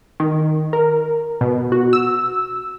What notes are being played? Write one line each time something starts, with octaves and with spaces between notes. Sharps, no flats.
D#3
A#4
B2
F#4
E6